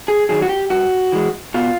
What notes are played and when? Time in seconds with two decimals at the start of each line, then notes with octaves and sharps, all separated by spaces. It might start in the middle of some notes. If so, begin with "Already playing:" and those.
0.08 G#4
0.29 D#3 F#3 G#4
0.42 F#4
0.49 G4
0.70 G2 F#4
1.12 E3 G#3
1.54 B2 F4